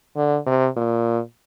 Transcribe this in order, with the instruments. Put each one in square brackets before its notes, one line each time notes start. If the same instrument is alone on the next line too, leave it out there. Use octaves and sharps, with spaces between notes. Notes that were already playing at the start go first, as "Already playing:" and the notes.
[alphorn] D3
C3
A#2